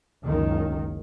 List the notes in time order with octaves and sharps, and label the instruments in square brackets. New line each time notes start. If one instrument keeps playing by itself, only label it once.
[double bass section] F#1 C#2 D#3